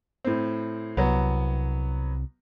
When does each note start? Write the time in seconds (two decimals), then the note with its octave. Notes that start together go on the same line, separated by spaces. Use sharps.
0.25 A2 C4
0.97 C2 F#3 B3